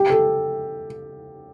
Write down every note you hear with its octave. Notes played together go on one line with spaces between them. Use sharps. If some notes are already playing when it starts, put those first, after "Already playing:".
Already playing: G4
A4